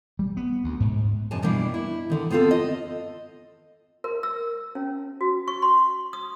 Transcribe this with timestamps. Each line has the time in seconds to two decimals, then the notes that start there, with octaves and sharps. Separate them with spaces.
0.19 G3
0.37 B3
0.64 D2
0.80 G#2
1.31 F#2 B2 G#5 A5
1.42 B2 G3 A#3 D4 E4
1.74 E4
2.10 D3 D#3
2.30 B3 C4 F4 G#4 A4
2.51 D#5
4.04 A#4
4.23 E6
4.75 C#4
5.21 F#4
5.48 C#6
5.62 C6
6.13 D#6